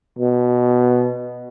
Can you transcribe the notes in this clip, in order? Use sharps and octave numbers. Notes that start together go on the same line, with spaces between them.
B2